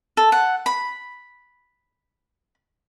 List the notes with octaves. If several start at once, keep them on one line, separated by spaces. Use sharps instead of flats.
A4
F#5
B5